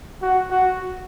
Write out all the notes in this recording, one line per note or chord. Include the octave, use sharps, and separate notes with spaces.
F#4
F#4